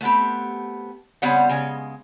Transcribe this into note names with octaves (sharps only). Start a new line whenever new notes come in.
A3 B3 C4 G4
C#3 G3 B3 C4 C#5 F#5
C#3 G#3